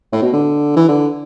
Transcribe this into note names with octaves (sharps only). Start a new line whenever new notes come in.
A2
B2
D3
E3
D3